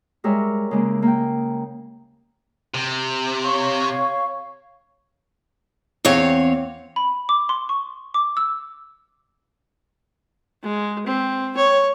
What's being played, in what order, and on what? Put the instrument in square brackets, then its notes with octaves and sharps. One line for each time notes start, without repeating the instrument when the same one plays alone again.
[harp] G3 G#3 A#4 C#5 E5
C#3 G#3 A#3
A#3 G5
[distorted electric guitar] C3
[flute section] C#5 F5 C#6
[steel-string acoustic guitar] E2 C4 C#5 F5
[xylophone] B5
D6
C6
C#6
D6
E6
[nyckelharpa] G#3
C4
C#5